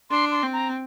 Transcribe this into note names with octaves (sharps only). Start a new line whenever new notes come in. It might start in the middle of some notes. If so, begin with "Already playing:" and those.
D4 C6
C6
C4
A#5